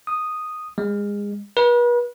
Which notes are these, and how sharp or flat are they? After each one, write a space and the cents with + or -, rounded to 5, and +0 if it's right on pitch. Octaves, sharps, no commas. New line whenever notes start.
D#6 -5
G#3 -25
B4 -40